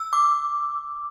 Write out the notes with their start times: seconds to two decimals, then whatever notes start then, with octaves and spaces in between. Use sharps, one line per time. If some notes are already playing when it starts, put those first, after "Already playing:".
Already playing: E6
0.13 D6